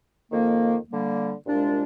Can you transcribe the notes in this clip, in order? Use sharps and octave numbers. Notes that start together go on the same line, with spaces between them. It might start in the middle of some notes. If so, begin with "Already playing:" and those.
F2 D#3 A#3
D3 G3 A#3
C2 A#2 G#3 D4 F4